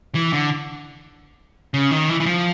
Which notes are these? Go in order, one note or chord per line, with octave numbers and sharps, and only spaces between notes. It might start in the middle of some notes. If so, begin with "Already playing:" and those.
E3
D3
C#3
D#3
E3
E3
F3